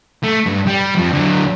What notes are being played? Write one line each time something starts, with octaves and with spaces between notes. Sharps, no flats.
A3
G2
G3
F2 F3
D3 F#3